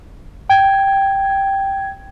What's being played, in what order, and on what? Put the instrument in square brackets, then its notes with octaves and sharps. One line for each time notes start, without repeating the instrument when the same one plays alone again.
[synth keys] G5 G#6